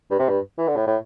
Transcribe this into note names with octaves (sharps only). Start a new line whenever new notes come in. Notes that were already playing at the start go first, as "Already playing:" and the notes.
G2
C3
G2
E3
D3
A2
A2